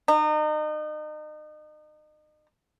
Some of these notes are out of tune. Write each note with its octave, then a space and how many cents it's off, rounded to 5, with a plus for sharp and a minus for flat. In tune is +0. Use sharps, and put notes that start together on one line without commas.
D#4 -35